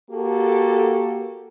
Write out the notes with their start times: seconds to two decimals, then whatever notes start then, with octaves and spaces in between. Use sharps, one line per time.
0.11 A#3 F#4 G4 A4